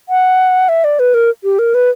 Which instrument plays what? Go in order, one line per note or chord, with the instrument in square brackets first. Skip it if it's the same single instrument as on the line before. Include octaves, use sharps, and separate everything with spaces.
[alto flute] F#5
E5
D5
B4
A#4
G4
A#4
B4